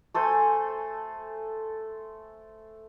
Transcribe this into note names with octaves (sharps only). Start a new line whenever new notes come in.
A3 A4 C5 G#5